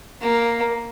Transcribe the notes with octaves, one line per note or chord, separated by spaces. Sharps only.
A#3